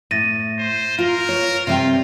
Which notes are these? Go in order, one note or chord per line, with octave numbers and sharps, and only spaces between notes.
A2 A6 A#6 D#7
C5
F4 A#4
C#5
C3 G3 F4 G5